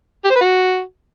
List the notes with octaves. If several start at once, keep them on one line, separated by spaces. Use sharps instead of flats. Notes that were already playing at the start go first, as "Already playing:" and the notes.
G4
C5
B4
F#4